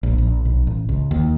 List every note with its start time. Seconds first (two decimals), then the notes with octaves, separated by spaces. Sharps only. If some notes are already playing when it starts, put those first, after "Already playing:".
0.03 A#1
0.18 A#1
0.45 B1
0.67 A1
0.89 C#2
1.11 D#2